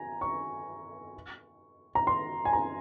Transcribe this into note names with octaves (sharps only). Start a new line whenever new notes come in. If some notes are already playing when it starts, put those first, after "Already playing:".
Already playing: G#5 A#5
C#6
A#5
C6
G#5
A#5